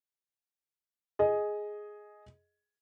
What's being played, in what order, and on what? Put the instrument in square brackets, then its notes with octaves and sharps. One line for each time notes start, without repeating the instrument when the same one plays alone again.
[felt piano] G#4 D#5